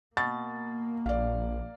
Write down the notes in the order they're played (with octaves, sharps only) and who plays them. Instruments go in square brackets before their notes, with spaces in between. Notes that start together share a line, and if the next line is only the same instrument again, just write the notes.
[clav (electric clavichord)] B2 [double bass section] A#3 [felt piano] A6
[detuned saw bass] A#1 [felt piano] D5 F5